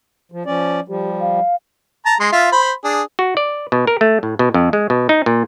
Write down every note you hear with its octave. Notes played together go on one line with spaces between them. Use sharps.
F3
F3 C#4 D5
F3 G3 G4
F5
A5 A#5
G#3 C6
F4 E5 F5
C5 B5
D4 G#4
F#4
D5
B2
A#4
A3
A2
B2
F2
G#3
B2
D#4
A#2